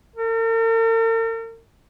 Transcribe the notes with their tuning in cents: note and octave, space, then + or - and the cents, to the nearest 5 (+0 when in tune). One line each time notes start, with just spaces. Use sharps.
A#4 -45